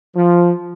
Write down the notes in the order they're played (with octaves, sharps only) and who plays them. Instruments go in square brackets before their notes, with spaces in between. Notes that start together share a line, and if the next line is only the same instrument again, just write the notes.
[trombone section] F3